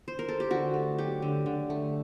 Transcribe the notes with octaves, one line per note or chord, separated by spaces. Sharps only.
C5
A#4
A4
G4
D3 F#4
A3
F#3 G4
D3
D3
A3